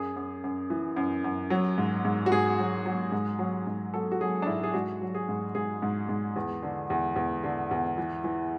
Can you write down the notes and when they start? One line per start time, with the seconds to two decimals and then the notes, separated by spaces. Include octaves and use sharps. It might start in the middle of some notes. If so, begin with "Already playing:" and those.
Already playing: F#2 G#4
0.16 F#2
0.44 F#2
0.70 E3
0.97 F#2
1.24 F#2
1.50 F#3
1.78 G#2
2.05 G#2
2.26 F#4
2.32 G#2 G#4
2.59 F#3
2.86 F#3
3.12 G#2
3.39 F#3
3.67 G#2
3.94 F#3 A4
4.12 F#4
4.21 F#3 G#4
4.42 D4
4.47 G#2 E4
4.64 G#4
4.74 G#2 F#4
5.02 F#3
5.15 G#4
5.29 G#2
5.55 G#2 G#4
5.82 G#2
6.09 G#2
6.36 E2
6.63 D3
6.90 E2
7.16 E2
7.44 D3
7.71 E2
7.98 E3
8.24 E3